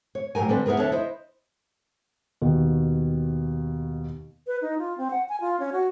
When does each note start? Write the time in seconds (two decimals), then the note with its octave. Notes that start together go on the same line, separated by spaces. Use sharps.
0.15 C#5
0.35 A2 F#3 G4 A#4 G#5
0.49 D3 G3 C4 A4 B4
0.66 B3 E4 G#4 A#4 B4
0.78 D#2 D4 A4 C#5 E5
0.92 E4 C5 D#5
2.42 D#2 B2
4.47 B4
4.62 D#4
4.78 F4
4.98 C4
5.11 F#5
5.29 G#5
5.41 F4
5.60 C#4
5.72 F#4